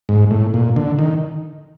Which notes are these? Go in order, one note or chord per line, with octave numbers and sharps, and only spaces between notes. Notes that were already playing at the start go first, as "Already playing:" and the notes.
G#2
A2
A#2
D3
D#3